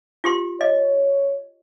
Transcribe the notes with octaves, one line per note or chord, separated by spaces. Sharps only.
F4 G4 C6
C#5 D#5